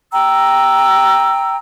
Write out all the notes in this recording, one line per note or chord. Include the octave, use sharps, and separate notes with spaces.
G5 A#5 E6